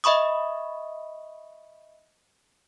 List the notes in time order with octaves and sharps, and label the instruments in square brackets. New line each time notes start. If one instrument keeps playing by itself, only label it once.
[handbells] D#5 E5 B5 C#6 D#6